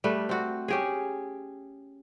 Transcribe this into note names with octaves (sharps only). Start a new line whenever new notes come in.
G3 A3 B4
C4 F#4
C#4 G4 G#4